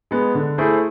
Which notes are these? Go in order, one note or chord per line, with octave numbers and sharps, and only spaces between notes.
G#3 B3
D3
A3 E4 G#4 C5